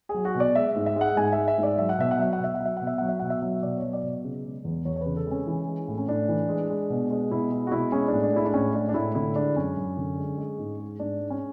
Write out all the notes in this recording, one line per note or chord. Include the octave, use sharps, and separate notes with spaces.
G#4
F#3
F#4
B2
D5
G#3 E5
G#2
E5
G#3 F#5
G#2 G#5
E5
G#3
E5
G#2
D5
F#3 E5
F#5
B2 E5
F#5
F#3 E5
F#5
B2 E5
F#5
F#3
E5
B2 F#5
E5
F#3 F#5
E5
B2 F#5
E5
F#3
B2 D5
F#3 C#5
D5
B2
C#3
G#3
E2
E2 C#5
C#5
C#3 B4
A4
G#3 C#4
E3
G#3
A2
C#4
A2 D4
E3
G#3
G#3
B2
G#3
B2 E4
G#3
F#4
B2 E4
G#3 C#4
A2 D4
D4
G#3 E4
D4
A2 C#4
G#3 D4
D4
A2 E4
D3 E4
G#3 D4
F#2 C#4
F#2
D3
G#3
G#3
G#2
G#3
G#2 D4
G#3
C#4